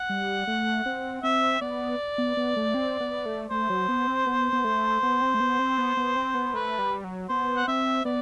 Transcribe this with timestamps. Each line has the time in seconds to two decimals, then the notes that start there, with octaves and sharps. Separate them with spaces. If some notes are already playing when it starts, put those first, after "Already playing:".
Already playing: F#5
0.09 G3
0.47 A3
0.86 C4
1.23 C4 E5
1.61 B3 D5
2.18 B3
2.37 B3
2.56 A3
2.74 C4
3.00 B3
3.26 A3
3.51 A3 C5
3.70 F#3
3.88 B3
4.08 C4
4.27 B3
4.53 B3
4.64 A3
5.03 B3
5.22 C4
5.34 A3
5.40 B3
5.59 C4
5.78 B3
5.97 B3
6.16 C4
6.34 B3
6.54 A3 B4
6.79 G3
7.04 F#3
7.29 B3 C5
7.56 F#5
7.68 C4 E5
8.05 B3 D5